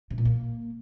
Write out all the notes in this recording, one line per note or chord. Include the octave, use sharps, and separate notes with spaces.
C3
A#2
A#3